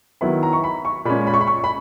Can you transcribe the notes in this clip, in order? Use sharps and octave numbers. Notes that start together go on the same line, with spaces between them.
D#3 F#3 B3 E4 B5
A#5
C#6
B5
C#6
A#2 G#3 C#4 B5
B5
C#6
B5
C#6
B5